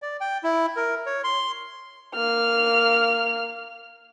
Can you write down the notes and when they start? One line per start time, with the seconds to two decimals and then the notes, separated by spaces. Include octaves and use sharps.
0.02 D5
0.21 G5
0.43 E4
0.77 A#4
1.06 C#5
1.24 C6
2.15 A#3 F6